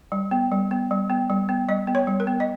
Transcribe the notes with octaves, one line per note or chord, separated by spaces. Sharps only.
G3
B3
G3
B3
G3
B3
G3
B3
G3 D#5
B3
C#5
G3
A#4
B3
D#5